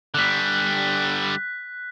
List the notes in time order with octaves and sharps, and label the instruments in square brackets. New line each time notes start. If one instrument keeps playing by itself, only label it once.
[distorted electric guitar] D3 G3 [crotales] F#6 B6